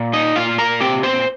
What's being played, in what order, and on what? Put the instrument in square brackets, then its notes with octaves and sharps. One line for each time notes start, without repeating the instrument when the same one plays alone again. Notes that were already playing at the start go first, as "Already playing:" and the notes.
Already playing: [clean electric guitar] A#2
D#4 D#5
A#2 F4 F5
A#4 A#5
C4 G4 G5
C5 C6